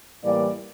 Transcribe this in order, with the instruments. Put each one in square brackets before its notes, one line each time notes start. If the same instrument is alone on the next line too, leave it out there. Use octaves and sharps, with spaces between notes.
[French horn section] A2 E3 G3 A#3 D5